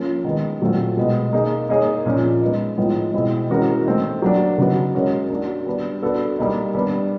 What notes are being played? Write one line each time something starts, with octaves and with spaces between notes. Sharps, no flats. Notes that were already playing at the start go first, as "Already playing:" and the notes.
Already playing: F3 A#3 C#4
D#3 G#3 B3
A#2 F#3 A3 C4 F4
B2 G#3 B3
A#3 D#4 G#4
A#3 D#4 G#4 C#5
A#2 F3 A#3 C#4
G#3 B3 D#4
A2 F3 G#3 B3 D#4
B2 G#3 C4 E4
E3 G#3 C#4 F#4 A#4
A3 C4 D#4
F#3 A#3 D4
C#3 F#3 B3 D#4 F#4
G#3 C#4 F#4 A#4 C#5
A#3 D4 F#4
G3 B3 D4
B3 D4 F#4 A4
G3 A#3 D#4
G3 B3 D4